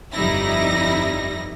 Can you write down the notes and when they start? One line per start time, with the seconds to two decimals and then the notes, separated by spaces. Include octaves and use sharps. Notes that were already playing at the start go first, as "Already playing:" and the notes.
0.14 G1 F2 G3 D#4 E4 A#6